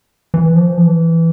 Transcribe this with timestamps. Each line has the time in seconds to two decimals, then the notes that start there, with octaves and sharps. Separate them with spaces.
0.34 E3
0.55 F3
0.77 E3